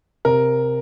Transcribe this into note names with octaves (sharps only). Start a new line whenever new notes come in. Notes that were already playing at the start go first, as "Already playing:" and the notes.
C3 A#4